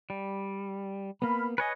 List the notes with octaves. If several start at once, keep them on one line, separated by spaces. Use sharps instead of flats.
G3
A#3 B3 B5 F6
B4 C#5 D#5 G#5